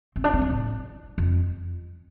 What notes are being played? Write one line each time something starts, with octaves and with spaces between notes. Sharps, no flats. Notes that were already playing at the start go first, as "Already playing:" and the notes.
C4
D4
C4
F3
A2
F2